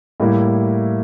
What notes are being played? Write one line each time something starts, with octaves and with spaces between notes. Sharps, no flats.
A2 G3 A#3 E4